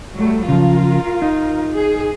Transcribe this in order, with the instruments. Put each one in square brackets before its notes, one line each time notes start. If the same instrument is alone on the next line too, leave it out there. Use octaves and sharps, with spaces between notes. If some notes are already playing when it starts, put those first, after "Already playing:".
[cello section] F#3 G3 A3
[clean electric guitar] C#3 F3 [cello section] F4 A#4
[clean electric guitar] D#4
[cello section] G#4